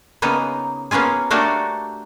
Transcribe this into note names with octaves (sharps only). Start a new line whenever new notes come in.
C#3 A#3 B3 D#4
A#3 B3 C#4 F4 G#4
A3 A#3 D4 F#4 G4 A4